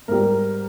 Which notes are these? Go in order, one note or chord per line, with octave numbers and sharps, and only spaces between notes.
G#2 G3 A#4